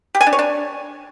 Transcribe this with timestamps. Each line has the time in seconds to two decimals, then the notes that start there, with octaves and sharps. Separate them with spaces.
0.15 G4
0.21 G#5
0.27 D4
0.33 C#5
0.39 D4